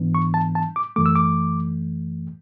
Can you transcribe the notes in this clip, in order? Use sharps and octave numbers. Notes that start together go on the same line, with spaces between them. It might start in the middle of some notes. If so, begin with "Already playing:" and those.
Already playing: G#2 E3 B3 D4
C#6
A5
A5
D6
F#2 E3 A3 D6
E6
D6